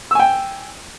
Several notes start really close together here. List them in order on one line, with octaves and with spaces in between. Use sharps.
E6 G#5 G5